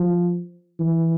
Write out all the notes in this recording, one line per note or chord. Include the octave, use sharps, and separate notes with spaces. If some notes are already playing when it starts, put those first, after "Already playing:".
Already playing: F3
E3